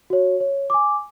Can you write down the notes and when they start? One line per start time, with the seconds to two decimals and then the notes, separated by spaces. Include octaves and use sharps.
0.10 F#4 C#5
0.40 C#5
0.70 G#5 D6